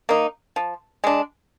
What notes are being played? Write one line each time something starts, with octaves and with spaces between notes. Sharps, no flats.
A#3 D#4
F3
G#3 D4